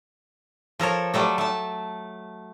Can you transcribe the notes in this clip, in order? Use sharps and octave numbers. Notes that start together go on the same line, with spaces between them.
F3 A4 A#4 C#5
F#3 G3 A3 A4
A3 A5